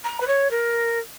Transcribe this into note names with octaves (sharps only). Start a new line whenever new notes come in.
A#5
B4
C#5
A#4